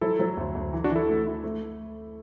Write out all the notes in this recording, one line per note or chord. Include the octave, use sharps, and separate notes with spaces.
F#3 E4 A4
F#3
D2
D2
E3
D4 F#4
E3
E4 A4
A3
E4
A3